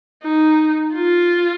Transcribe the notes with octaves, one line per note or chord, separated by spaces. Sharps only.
D#4
F4